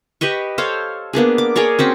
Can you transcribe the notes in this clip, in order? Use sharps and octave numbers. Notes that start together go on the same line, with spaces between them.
G4 B4 D#5 C#6
A4 C5 C#5 F5
A#3 B3 D4 G#4
D6
G#4 A#4 C#5 D5
C4 C#4 F#4